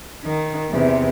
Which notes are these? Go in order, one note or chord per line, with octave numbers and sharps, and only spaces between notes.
D#3
E2 C3